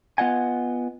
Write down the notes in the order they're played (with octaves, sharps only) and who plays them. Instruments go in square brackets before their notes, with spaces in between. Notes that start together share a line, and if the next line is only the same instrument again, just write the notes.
[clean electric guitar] B3 F4 D#5 F#5 G#5